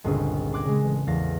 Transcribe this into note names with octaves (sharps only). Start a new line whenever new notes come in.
G1 C#2 A#2 C4 G#4 E6
C6 D6 F#6 G#6 A#6
C#3 G#3
A1
A1 E2 A#3 F5 A6 A#6